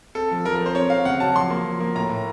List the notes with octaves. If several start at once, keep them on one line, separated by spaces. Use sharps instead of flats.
C4 A4
F3
F3 A#4
A#4
C4
C5
C4 C#5
C4 F5
C#3 F#5
F#3 A5
F3 C6
A#3
F3
A#3
A2 A#5
A2